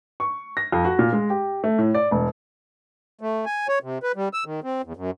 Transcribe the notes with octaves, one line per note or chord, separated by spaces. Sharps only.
C#6
A#6
F2
F#4
A#2
G#3
G4
A3
A2
D5
E1
A3
G#5
C#5
C3
B4
G3
E6
D#3
C4
E2
F#2